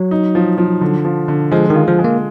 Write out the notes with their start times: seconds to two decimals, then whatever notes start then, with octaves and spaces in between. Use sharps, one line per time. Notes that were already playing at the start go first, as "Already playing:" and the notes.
Already playing: F#3
0.11 D#4
0.35 F3
0.58 F3
0.81 D3
1.05 F3
1.28 D3
1.51 F3 G#3
1.70 D#3
1.75 F4
1.88 F3
1.99 G#3
2.04 A#3